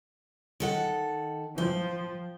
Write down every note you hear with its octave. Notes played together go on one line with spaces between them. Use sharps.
D#3 A4 F#5
F3 G5